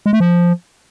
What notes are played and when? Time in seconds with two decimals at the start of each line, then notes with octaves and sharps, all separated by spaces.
0.06 G#3
0.13 A3
0.20 F3